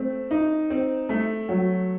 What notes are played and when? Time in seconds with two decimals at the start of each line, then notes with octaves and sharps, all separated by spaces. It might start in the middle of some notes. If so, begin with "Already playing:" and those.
Already playing: A3 C4
0.31 D#4
0.70 C4
1.09 A3
1.49 F#3